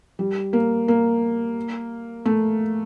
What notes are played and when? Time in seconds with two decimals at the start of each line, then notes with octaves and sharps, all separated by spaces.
0.19 G3
0.53 A#3
0.88 A#3
2.25 A3